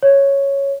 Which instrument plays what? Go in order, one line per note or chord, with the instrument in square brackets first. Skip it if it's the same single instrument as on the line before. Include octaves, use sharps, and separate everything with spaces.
[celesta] C#5